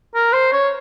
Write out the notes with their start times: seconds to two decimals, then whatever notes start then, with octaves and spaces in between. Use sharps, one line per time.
0.15 A#4
0.33 C5
0.52 C#5